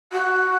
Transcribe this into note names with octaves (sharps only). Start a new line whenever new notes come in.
F#4